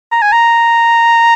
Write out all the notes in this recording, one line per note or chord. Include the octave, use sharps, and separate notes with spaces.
A#5
G#5
A#5